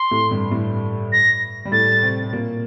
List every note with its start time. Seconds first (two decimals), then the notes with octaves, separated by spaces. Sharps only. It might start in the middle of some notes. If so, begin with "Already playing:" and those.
Already playing: C6
0.11 A2 A3
0.31 G2 G3
0.51 A2 A3
1.12 A#6
1.65 G3
1.72 A2 A3 A6
2.02 C3 C4
2.24 C4
2.33 A#2 A#3